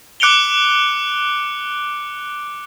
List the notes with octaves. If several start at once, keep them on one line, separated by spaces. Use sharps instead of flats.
D6 F#6 C#7 D7 F7 G7